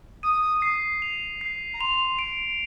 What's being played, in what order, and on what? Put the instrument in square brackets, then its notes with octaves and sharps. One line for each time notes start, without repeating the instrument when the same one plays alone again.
[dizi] D#6 [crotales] D#7
[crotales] C7
F7
C7
[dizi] A#5
[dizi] C6 [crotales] F7
[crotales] D7